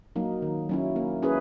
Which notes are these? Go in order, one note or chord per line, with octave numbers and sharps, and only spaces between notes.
F#3 A#3 D#4
D#3
F#3 C#4 E4
A#3
C#4 E4 G#4 B4